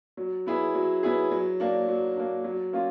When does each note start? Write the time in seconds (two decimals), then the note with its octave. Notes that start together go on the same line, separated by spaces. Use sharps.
0.17 F#3
0.46 B3 E4 G#4
0.75 F#3
1.03 B3 E4 G#4
1.31 F#3
1.60 A#3 D4
1.88 F#3
2.16 A#3 D4
2.44 F#3
2.73 A#3 C#4 F4